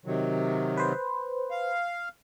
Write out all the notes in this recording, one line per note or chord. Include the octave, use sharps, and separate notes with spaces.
C3 D#3 F#3
B4 C5
F5